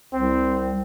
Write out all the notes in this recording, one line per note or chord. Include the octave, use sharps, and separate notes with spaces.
C2 C4